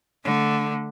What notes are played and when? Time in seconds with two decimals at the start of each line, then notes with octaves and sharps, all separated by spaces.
0.24 D3 A3